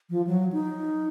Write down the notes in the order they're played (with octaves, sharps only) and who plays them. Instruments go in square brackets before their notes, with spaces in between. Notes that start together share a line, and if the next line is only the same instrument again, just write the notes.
[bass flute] F3
F#3
D#4